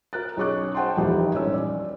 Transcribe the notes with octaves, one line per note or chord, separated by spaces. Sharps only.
A#4 F#6 A6
B1 C#4 G#4 C#6 D6 F#6
C5 F#5 G5 A5 C6
D#1 F2 E3 G3 D#4
G#1 C#4 E6
D5